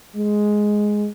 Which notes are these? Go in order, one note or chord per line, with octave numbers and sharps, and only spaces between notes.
G#3